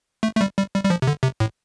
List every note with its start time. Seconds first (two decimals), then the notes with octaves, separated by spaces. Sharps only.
0.23 A3
0.37 A3
0.41 G3
0.57 G3
0.74 G3
0.85 G3
0.90 F3
1.02 C3
1.07 D3
1.23 C3
1.40 A2